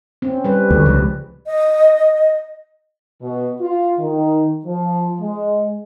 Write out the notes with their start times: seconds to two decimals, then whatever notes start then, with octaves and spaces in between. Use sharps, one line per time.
0.22 C4 C#4
0.44 G3 B4
0.71 D2
0.86 C#2 F3
1.46 D#5
3.22 B2
3.61 F4
3.98 D#3
4.65 F3
5.20 G#3